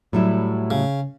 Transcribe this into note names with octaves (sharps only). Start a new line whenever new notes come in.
A2 F#3 G3 E4
C#3